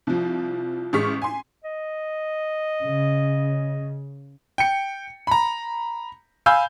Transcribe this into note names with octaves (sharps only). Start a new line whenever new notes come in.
C2 F3
A1 G#3 C#6 F6 B6
G#5 C6
D#5
C#3
G5 C#7
A#5 B5
F5 G#5 B5 E6 G6